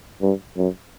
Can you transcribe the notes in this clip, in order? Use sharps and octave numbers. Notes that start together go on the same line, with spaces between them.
G2
F#2